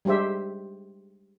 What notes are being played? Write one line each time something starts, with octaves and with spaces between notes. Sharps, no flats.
G3 G#3 G4 C5 E5